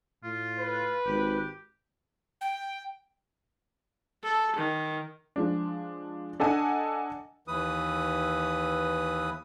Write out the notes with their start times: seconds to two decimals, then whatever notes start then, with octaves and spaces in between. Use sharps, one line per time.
0.24 A2 F4
0.59 B4
1.06 G#1 G4
2.41 G5
4.23 A4
4.57 D#3
5.36 F3 G#3 D4
6.40 D4 A4 D#5 F#5 G#5
7.48 D#2 E3 B4 D#6